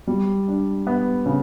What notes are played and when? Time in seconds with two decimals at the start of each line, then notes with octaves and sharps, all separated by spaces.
0.07 G3
0.48 D4
0.87 B3
1.26 C#3